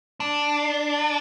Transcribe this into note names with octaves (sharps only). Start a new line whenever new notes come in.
D4